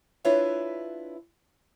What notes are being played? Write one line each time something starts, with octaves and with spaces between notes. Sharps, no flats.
D4 E4 F4 B4 C#5 E5